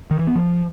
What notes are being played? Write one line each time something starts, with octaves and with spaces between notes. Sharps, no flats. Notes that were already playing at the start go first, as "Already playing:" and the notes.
D#3
E3
B3
F3